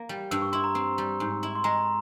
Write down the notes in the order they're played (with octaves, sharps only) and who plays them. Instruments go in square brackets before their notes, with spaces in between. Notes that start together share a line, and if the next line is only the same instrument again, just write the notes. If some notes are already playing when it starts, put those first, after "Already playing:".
Already playing: [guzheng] A#3
G3
[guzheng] G2 [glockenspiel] E6
[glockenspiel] C#6
[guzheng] E4 [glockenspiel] C6
[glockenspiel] A#5
[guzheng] C4
G3
G#2
E4
[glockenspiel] C6
[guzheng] G#3 [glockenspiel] A#5